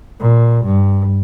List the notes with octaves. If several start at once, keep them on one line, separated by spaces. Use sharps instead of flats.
A#2
G2